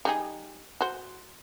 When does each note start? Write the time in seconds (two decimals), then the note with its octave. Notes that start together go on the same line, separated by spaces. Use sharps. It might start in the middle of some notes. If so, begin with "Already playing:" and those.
0.05 G3 D#4 G#4
0.81 F#4 C5